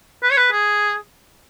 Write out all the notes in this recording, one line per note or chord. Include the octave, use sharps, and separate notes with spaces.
B4
C#5
B4
G#4